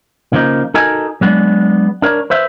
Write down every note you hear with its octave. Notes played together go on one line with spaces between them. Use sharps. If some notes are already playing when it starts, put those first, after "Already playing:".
C#3 F3 A#3 D#4
D#4 F#4 A4 A#4 D#5 G#5
F#3 G#3 B3 D4
D4 A#4 C#5
B4 C5 E5